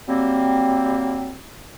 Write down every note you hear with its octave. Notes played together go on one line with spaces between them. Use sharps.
F#3 G3 A#3 C4